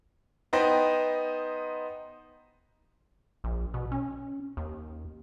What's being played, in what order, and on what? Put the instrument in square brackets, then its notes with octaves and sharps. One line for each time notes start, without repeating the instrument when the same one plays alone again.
[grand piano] B3 D#4 C5 G5 A#6
[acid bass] A#1
B2
C#4
D#2